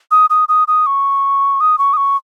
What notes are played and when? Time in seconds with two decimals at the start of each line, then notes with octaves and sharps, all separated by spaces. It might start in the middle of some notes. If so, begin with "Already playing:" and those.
0.11 D#6
0.30 D#6
0.49 D#6
0.68 D#6
0.86 C#6
1.60 D#6
1.78 C#6
1.93 D#6
1.97 C#6